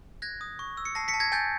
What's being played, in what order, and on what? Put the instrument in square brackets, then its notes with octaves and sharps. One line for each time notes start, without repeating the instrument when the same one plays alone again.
[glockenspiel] F#6 G#6 A#6
D#6
C#6
E6
C#7
A5 A#6 C7
B6 C#7
A5
G#6 A#6
G#5 G6 A6